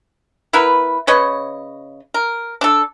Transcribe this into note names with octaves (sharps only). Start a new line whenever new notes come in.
B3 E4 A#4 B4
C#3 B4 C#5 D#5
A#4
D4 A4